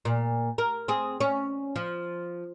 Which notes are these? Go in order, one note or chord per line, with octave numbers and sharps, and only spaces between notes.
A#2
A#4
C4 G#4
C#4
F3